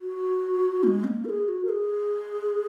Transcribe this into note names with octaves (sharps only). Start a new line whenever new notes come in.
F#4
A#3
G#3
C#4
A#3
A#4
G#4
G#4
F#4
A#4
G#4